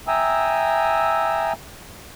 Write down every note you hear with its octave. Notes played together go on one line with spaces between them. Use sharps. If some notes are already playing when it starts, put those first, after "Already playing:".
E5 G5 G#5 A#5 D#6 E6